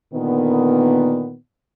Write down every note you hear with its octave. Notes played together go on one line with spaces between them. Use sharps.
A#2 D3 D#3 B3